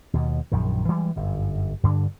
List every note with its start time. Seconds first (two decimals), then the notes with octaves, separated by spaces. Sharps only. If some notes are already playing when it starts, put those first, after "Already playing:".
0.14 D#2 B2
0.52 A#1 F#2 D#3
0.89 E3 G3 G#3
1.16 G1 F#2
1.83 G2 D3 D4